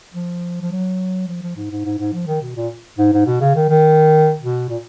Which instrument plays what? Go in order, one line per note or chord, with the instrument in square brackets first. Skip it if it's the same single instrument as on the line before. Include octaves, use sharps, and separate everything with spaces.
[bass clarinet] F3
F3
F#3
F3
F3
G#2
G#2
G#2
G#2
F3
D#3
B2
A#2
G#2
G#2
B2
C#3
D#3
D#3
B2
A#2